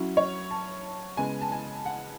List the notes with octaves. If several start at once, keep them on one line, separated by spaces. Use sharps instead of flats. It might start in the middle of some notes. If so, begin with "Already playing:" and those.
Already playing: F#3 C#4 E4
C#5
A5
C#3 G#3 B3 G#5
A5
G#5
F#5